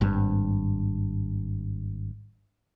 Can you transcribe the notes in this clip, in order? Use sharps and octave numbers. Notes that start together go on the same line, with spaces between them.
G#1 G2